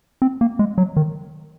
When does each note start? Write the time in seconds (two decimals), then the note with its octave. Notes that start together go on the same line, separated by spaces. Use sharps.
0.22 C4
0.41 A#3
0.59 G#3
0.78 F#3
0.96 D#3